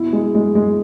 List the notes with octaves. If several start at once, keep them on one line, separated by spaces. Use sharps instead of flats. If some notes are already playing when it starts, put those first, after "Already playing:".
Already playing: B2 E4
G#3
G#3
G#3